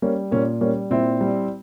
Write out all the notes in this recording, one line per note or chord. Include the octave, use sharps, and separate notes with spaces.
G3 A#3 C#4
A#2 A#3 C#4
G3 A#3 C#4
A#2 C4 E4
G3